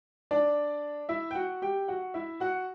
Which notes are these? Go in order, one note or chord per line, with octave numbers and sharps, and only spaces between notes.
D4 D5
E4 E5
G5
F#4 F#5
G4 G5
F#4 F#5
E4 E5
F#4 F#5